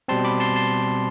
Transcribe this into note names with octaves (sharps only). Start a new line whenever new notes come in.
B2 G3 C4 A5 C6
B5 D6
A5 C6
A5 C6